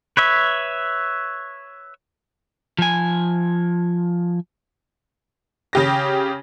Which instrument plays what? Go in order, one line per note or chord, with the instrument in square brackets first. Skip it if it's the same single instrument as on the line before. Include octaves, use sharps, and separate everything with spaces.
[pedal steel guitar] B4 C#5 E5
[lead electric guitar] F3 G#5
[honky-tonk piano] C#3 G4 A#6